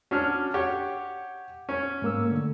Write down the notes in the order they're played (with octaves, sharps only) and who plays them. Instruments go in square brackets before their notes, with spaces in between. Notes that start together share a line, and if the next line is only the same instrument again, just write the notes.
[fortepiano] C#4 D4 F6 [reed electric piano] F#4
[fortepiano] G4 C#5 [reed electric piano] F#5
[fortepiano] C#4
[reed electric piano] G#2 A#3 E6
D3 A3